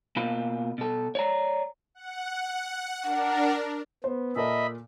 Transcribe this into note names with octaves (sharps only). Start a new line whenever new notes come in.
B2 A#3 F4 B5
B2 A4
C#5 D5 A#5
F#5
D4 A#4 F#5
B3 C5
A#2 A4 A#4 D#5 E5 B5